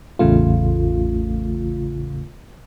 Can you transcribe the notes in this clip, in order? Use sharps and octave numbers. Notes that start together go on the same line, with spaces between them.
A1 E2 C#3 A3 F4